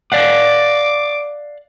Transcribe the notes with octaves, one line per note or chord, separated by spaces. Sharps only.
D5 F5 F#5 D6